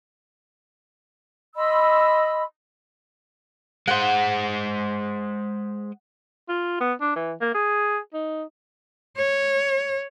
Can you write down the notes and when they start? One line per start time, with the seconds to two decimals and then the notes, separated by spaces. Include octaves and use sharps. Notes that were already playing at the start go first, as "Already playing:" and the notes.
1.55 D#5 B5 C6 E6
3.88 G#3 C5 F#5
6.49 F4
6.80 B3
7.01 D4
7.16 E3
7.41 A#3
7.55 G#4
8.13 D#4
9.17 C#5